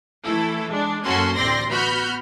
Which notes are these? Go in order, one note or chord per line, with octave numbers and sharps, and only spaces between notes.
E3 A3 E4 A4
G#3 D4
F#2 A#3 C#4 F#4 A4 C6
A1 D2 C4 D5 C6 A#6
B3 F#4 B5 F6 G6